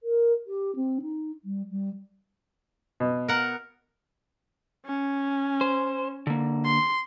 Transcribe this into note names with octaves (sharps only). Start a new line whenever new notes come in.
A#4
G4
C4
D#4
G3
G3
B2
A#4 F#5
C#4
C5
D3 A#3
C6